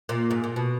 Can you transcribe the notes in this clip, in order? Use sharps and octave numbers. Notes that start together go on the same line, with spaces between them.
A#2
G#2
A#2
B2